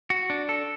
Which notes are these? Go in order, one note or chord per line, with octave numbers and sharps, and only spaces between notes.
F#4
D4
A4